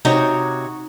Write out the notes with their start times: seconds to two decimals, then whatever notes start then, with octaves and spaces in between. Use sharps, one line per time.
0.05 C3 D#4 F#4 C#5